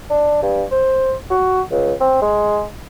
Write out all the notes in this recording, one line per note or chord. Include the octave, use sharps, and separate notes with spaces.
D4
G2
C5
F#4
C#2
C4
G#3